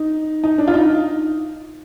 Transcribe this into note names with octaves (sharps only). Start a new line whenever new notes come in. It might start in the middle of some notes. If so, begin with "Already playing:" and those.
Already playing: D#4
D#4
D4
F4
D#4